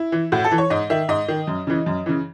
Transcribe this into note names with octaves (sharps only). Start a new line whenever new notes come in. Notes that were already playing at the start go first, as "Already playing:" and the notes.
Already playing: E4
E3
A2 F#4
A4
E3
C#5
G#2 D#5
D#3 E5
G#2 D#5
D#3
F#2
C#3 E3
F#2
C#3 E3